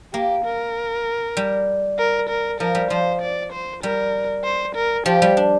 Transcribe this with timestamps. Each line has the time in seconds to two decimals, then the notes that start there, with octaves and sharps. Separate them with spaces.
0.14 A#3 G4
0.44 A#4
1.37 G3
1.98 A#4
2.29 A#4
2.60 F3 A#4
2.75 G3
2.90 F3 C5
3.21 D5
3.52 C5
3.83 G3 A#4
4.44 C5
4.75 A#4
5.06 F3 G4
5.22 G3
5.37 D4